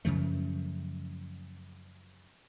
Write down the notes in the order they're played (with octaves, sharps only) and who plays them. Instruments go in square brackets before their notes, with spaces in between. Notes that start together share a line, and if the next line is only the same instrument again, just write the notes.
[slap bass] F#2 C#3 F3 A3